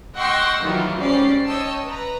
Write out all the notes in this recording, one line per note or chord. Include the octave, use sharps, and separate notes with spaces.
D#5 F#5 G5 C6 C#6 E6
D#3 E3 F#3 G3 F4 F#4
G#2 G3 C#4 C5 D5 C7
C#5 D#5 G5 A5 E6
B4 A#5